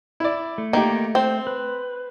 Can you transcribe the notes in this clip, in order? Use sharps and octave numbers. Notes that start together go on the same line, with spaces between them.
E4 D5
A3
D#3 A#3 G4
C4 C5
B4